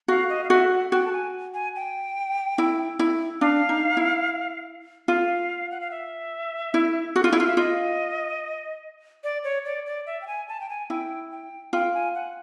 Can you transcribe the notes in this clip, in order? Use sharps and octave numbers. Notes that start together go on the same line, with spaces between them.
F#4 F5
D#5
F5
F#4 E5
F#5
F#4 G5
A5
G#5
G#5
G5
E4
E4
D4 F5
D#4
E4
F4 F5
F#5
F5
E5
E4
F#4
F4
E4
F4 F5
E5
F4 D#5
D5
C#5
D5
D5
E5
G5
G#5
A5
G5
G#5
E4 G5
G5
F4 G5
G#5
F#5